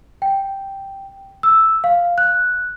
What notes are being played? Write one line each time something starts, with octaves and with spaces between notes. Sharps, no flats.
G5
E6
F5
F#6